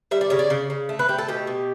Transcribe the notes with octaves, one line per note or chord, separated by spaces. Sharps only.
G3 E5
D5
C#3 C#5
D5
C#3
C#3
A3
B4
A3 G4
A4
B2 G4
B2